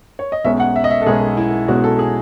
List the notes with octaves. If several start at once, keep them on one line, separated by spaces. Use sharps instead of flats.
C#5
D#5
B1 B2 G#3 C#4 E5
F#5
E5
D#5
E5
A4
B1 B2 G#3 C#4 G#4
E4
B1 B2 G#3 C#4 F#4
A4
G#4